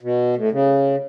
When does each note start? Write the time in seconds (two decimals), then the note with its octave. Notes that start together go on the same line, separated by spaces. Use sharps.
0.01 B2
0.36 A2
0.52 C#3